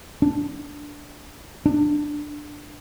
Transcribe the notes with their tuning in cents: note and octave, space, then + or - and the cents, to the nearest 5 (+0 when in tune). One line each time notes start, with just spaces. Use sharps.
D4 -5
D4 +10